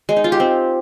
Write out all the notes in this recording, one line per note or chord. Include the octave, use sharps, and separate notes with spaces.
G#3
D#4
F4
G4
C4